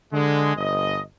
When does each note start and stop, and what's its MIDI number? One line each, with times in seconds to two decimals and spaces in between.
0.13 0.52 50
0.13 0.52 56
0.57 1.01 31
0.57 1.01 75